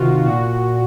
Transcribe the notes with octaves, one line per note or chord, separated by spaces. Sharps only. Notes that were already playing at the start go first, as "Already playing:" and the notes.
Already playing: C3 D#3 F4 F#4
A#2 F#4